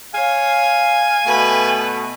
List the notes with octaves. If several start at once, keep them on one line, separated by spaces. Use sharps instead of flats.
C#5 F5 G#5
B2 A3 B4